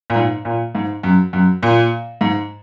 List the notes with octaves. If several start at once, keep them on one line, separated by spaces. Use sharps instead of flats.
A#2
G#2
A#2
G#2
F#2
F#2
A#2
G#2